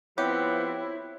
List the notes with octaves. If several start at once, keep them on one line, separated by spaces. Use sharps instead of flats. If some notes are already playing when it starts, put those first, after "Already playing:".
F3 B3 C4 E4 G4 C#5 E5